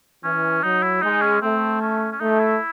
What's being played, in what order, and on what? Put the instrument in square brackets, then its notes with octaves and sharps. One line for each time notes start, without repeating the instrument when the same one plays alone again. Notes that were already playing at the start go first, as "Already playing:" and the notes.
[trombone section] E3 [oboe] C#4
[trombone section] F#3 [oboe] D#4
[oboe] E4
[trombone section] G#3 [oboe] D#4
[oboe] C#4
[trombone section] A3 [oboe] C4
[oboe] C#4
C#4
[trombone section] A3 [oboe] D#4
[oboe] E4